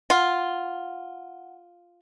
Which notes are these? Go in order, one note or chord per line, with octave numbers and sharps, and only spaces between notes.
F4 F#5